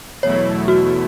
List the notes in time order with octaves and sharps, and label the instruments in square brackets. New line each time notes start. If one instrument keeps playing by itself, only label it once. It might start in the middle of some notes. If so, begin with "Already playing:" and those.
[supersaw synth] E2 B2 F#3 A3 E4 [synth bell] C#5
[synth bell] F#4